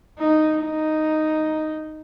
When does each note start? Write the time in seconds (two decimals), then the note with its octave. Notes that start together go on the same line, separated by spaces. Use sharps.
0.18 D#4
0.64 D#4